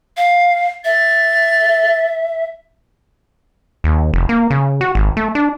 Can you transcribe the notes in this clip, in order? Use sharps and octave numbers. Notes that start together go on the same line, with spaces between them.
F5
E5 A6
D#2
F1
A#3
C#3
F#4
G#1
A3
D4